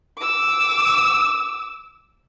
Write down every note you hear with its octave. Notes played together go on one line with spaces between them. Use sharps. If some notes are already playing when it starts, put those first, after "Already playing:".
D6 E6